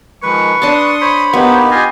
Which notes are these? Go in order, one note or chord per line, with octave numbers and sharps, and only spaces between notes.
D#3 F3 G#3 B4 C#6
D4 A5 C6 D#6
C5 C#5 B5
A#3 B3 D#4 G4
F4 G4 D#5 G#5